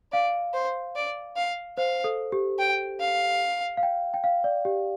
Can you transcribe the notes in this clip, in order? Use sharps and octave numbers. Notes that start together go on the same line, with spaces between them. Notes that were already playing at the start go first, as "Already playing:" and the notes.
D5 F5
C5
D5
F5
C5 F5
A4
G4
G5
F5
F5
G5
G5
F5
D5
G4